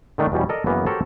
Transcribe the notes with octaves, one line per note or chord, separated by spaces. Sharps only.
D3 D#3 A3 D4
E2 B2 G3 C#4
A4 A#4 D5 D#5
F#2 C#3 E3 A#3 B3
F#4 G4 A4 A#4 C5 C#5